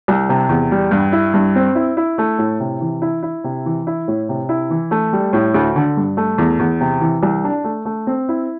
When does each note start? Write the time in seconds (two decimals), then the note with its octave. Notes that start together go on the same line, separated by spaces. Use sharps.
0.08 C2
0.29 C3
0.49 E2
0.71 G3
0.91 G2
1.12 E4
1.34 G2
1.55 C4
1.75 E4
1.97 E4
2.18 A3
2.38 A2
2.60 C3
2.81 E3
3.02 E4
3.23 E4
3.44 C3
3.66 E3
3.87 E4
4.08 A2
4.29 C3
4.49 E4
4.70 E3
4.91 A3
5.13 G3
5.33 A2
5.54 D2
5.76 D3
5.97 G2
6.17 A3
6.38 E2
6.59 E2
6.81 C3
7.01 E3
7.23 C2
7.44 D4
7.64 A3
7.85 A3
8.07 C4
8.29 E4